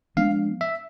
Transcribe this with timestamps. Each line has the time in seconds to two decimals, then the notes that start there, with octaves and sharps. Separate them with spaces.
0.17 F3 G#3 B3 D4 F5
0.61 E5